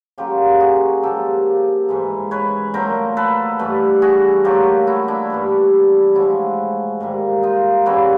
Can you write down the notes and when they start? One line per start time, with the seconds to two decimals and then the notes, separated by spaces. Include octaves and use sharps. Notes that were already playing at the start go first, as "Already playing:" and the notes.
0.18 C#3 F#3 A#3 F4 G4
0.60 F#4 G#4
1.03 A#2 F3 A#3 G4 A4
1.89 G#2 E3 G#3
2.31 B4 C#5
2.74 A#2 F#3 A3 A#4 C5
3.17 A4 B4
3.59 G2 E3 A3
4.02 F#4 G#4
4.44 A#2 F#3 A3 F4 G4
4.87 E4 F#4
5.08 D4 E4
5.30 G2 E3 G3
6.15 A2 F3 G#3 E4 F#4
7.00 G#2 D#3 G3 A#3
7.43 D#4 F4
7.86 C#3 E3 G3 A#3 E4 F#4